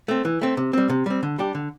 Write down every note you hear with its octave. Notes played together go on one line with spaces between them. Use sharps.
A3 C4
E3
A3 C4
C3
G3 C4
C3
G3 C4
D3
G3 D4 G4
D3